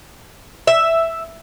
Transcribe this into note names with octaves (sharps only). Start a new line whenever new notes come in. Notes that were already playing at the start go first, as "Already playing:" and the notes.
E5